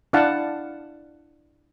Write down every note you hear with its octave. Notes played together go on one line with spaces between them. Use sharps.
D4 E4 F5 F#5 A5